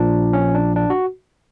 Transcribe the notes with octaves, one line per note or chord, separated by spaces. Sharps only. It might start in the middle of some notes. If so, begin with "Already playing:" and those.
Already playing: A#1 A#2 F3 D4
C#4
D4
D4
F#4